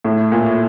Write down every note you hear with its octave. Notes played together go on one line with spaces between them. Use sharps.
A2
A#2